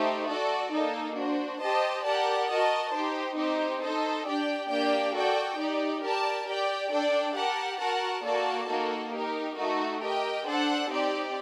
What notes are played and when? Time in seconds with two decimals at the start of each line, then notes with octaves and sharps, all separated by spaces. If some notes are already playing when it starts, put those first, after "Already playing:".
Already playing: A3 D#4 G4 C5
0.28 F#4 A4 D5
0.71 A#3 D#4 A4
1.16 D4 F#4 C5
1.61 G4 C5 D#5 A5
2.04 G4 A#4 D5 F#5 A5
2.49 F#4 A#4 D#5 A5
2.93 D#4 G4 C5
3.37 C4 D#4 G4 C5
3.81 D#4 A4 C5 D#5
4.26 D4 G4 D5 G5
4.69 A#3 D4 G4 D5 G5
5.15 F#4 A4 D5 G5
5.58 D#4 G4 D5
6.02 G4 A#4 D5 A5
6.47 G4 D5 G5
6.91 D4 A4 D5 G5
7.36 G4 A#4 F#5 A5
7.79 F#4 A#4 F#5 A5
8.24 A#3 F#4 A4 D5 A5
8.68 A#3 D#4 F#4 A4
9.13 D#4 G4 A#4
9.57 A3 D#4 F#4
10.02 G4 A#4 D#5 G5
10.46 D4 A4 C5 F#5 A5
10.90 C4 D#4 G4 D5